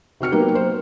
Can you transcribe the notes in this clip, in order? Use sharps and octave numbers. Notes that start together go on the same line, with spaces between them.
C3 F#4 F6 C#7
F#3 A#3 B3 D#4 G4
C5